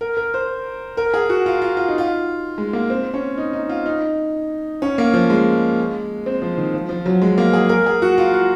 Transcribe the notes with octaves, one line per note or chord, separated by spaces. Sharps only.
A#4
A#4
C5
A#4
G#4
F#4
F4
F4
F4
D#4
F4
G#3
A#3
C4
C#4
D#4
D#4
F4
D#4
C#4
A#3
F3
G#3
C4
F3
D#3
F3
F3
F#3
G#3
A#3
G#4
A#4
G#4
F#4
F4
F#4